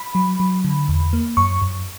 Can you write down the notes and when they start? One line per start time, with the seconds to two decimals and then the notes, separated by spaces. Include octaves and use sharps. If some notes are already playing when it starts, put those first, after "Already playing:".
Already playing: B5
0.15 F#3
0.40 F#3
0.64 D3
0.88 E2
1.13 A#3
1.37 F#2 C#6
1.62 F#2